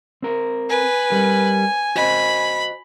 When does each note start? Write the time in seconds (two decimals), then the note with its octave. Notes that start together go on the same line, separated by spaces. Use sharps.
0.22 C4 A#4
0.69 B4 G#5
1.10 G3 A#4
1.96 F#4 C5 D#5 B5